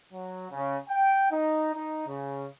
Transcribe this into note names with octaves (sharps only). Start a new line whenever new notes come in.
F#3
C#3
G5
D#4
D#4
C#3